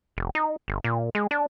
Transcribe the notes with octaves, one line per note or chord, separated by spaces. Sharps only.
F1
D#4
G1
A#2
G#3
D4